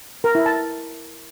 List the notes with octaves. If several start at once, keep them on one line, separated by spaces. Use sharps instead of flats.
A#4
E4
A5